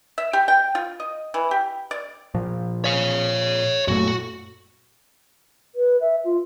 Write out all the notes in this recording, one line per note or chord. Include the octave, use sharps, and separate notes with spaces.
E5
G4
G5
F4
D#5
E3
G4
D5
A#2 F3
C#5 F5
F#2 A#2 A3 F#4
B4
E5
F4